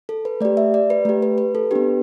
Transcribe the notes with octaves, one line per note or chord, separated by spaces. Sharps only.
A4
B4
A3 G4 D5
E5
D5
B4
A3 G4
B4
B4
A4
B3 D4 G4 B4